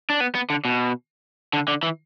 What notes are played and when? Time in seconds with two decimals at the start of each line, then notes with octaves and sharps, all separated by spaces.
0.10 D4
0.20 B3
0.35 B3
0.50 D3
0.65 B2
1.53 D3
1.68 D3
1.83 E3